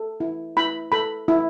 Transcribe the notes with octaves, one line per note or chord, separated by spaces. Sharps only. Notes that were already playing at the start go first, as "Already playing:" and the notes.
Already playing: A4
E4
E4 B5
A4 B5
E4